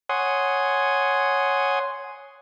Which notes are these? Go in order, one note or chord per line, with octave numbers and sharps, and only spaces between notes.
C#5 F#5 G#5 C6 D#6